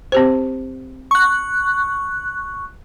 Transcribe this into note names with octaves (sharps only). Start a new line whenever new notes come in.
C4 G4 C5
C#6 F#6